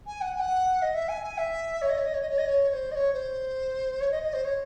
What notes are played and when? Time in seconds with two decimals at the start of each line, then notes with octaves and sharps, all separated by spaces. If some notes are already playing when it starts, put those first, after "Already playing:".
0.06 G#5
0.21 F#5
0.35 G#5
0.39 F#5
0.82 D#5
0.94 E5
1.08 G#5
1.23 G#5
1.38 E5
1.81 C#5
1.89 D#5
1.97 C#5
2.05 D#5
2.13 C#5
2.21 D#5
2.30 C#5
2.38 D#5
2.45 C#5
2.69 C#5
2.73 C5
2.91 D#5
2.95 C#5
3.13 C5
4.00 C#5
4.11 D#5
4.22 D#5
4.33 C5
4.44 C#5